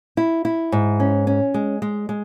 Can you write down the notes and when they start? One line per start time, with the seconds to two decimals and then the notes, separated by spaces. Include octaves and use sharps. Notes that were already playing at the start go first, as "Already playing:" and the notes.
0.17 E4
0.45 E4
0.72 G#2
1.00 C#4
1.27 C#4
1.54 G#3
1.82 G#3
2.09 G#3